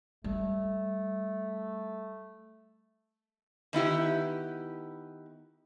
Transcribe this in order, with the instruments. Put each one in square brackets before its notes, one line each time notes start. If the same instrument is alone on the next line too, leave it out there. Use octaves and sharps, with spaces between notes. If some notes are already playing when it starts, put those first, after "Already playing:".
[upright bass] G3 [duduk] A3
[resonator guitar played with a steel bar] D#3 B3 E4 G4